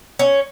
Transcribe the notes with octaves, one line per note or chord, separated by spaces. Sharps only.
C#4